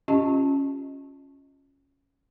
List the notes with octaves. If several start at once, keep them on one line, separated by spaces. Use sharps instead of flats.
C#4 F4 G4 D#5 A5